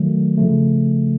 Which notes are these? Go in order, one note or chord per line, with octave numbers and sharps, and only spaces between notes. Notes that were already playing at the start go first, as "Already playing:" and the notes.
Already playing: D#3 F#3 A3
C#3 F3 A3